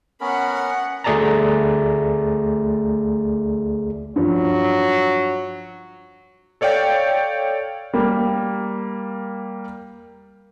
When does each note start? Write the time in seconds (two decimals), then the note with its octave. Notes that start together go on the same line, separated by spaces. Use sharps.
0.21 B3 C#4 A#4 F#5 B5
0.54 F#5
1.04 D2 A3 G#4 D5 A5 A#5
4.16 G2 F3 F#3
6.61 A4 C#5 D5 F5 G5
7.93 G3 A#3